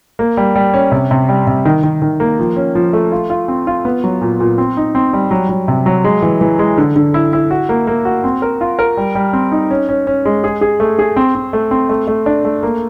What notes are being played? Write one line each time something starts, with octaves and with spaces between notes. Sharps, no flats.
A#3
G3
G3
C#4
C3
C3
G3
C3
D#3
D#3
D#3
A#3
F3
C#4
F3
A3
F4
F4
C4
F4
B3
F#3
A#2
A#2
C4
D#4
C4
G3
F#3
F#3
C3
F#3
G#3
E3
E3
G#3
D3
D3
E4
E4
F#4
A#3
A#3
F#4
C4
A#4
F4
A#4
G3
G3
C4
D#4
C#4
C#4
C#4
G#3
G#4
G#4
A3
G#4
C4
C4
A3
C4
A3
A3
D4
A3
A#3